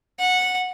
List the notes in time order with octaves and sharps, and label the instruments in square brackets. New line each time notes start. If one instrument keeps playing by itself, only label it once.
[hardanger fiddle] F#5